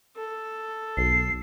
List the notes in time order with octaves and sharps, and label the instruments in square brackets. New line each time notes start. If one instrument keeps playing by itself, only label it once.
[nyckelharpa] A4
[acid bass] B1 [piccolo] C7